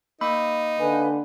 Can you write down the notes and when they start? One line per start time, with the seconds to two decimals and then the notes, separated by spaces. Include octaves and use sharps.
0.21 A#3 D#4 B5 D6
0.80 D3 B4 F5 G#5